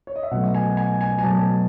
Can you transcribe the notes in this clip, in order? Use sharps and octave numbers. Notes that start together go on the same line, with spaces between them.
C#5
D#5
E5
B2 F#3 A3 F#5
G#5
F#5
G#5
G#5
G#5
B2 F#3 A3 A5